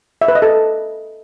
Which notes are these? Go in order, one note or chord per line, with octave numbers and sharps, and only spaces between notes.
E5
B4
D#5
A4